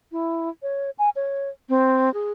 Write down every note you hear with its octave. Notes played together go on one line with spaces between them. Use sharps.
E4
C#5
G#5
C#5
C4
G#4